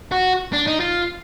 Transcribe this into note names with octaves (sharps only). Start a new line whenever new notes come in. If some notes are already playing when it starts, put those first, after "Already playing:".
F#4
D4
D#4
F4